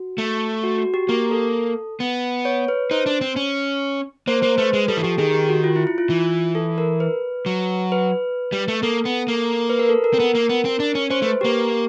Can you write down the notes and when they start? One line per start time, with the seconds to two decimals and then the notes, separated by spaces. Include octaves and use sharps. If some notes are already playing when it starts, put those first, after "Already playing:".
Already playing: F#4
0.18 A3
0.64 F#4
0.78 F#4
0.94 G4
1.09 A#3 G4
1.31 A4
2.00 B3
2.45 C#5
2.68 B4
2.91 D#4 C5
3.06 D4
3.21 C4
3.36 C#4
4.27 A#3 C5
4.43 A#3 C5
4.58 A3 B4
4.73 G#3
4.88 G3 A4
4.97 E3
5.03 F3 G4
5.18 D#3 G#4
5.34 G4
5.49 F#4
5.64 F4
5.76 E4
5.87 E4
5.98 F4
6.10 E3
6.55 A4
6.78 A#4
7.00 B4
7.46 F#3
7.92 B4
8.52 G3
8.68 A3
8.83 A#3 A4
9.05 B3
9.28 A#3
9.70 B4
9.79 A#4
9.89 A4
10.04 A#4
10.14 C4
10.19 B3 A#4
10.35 A#3
10.49 B3
10.65 C4
10.80 D4
10.95 C#4
11.10 C#4 C5
11.22 A3
11.25 B4
11.41 A#3 G4